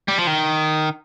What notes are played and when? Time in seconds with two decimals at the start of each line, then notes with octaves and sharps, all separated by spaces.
0.08 G3
0.18 F3
0.27 D#3